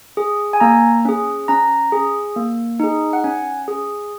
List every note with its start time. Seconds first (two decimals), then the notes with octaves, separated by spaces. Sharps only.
0.17 G#4
0.53 G#5
0.60 A#3 A#5
1.05 C#4 G#4
1.48 C#4 A#5
1.92 G#4
2.36 A#3
2.80 D#4 G#4
3.13 F#5
3.24 C#4 G#5
3.68 G#4